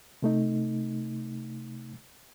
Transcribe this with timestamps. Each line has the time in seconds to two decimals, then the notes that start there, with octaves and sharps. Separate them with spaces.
0.22 C3 A3 D#4